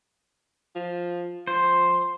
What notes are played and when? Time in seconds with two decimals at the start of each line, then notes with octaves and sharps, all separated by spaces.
0.75 F3
1.47 F3 C5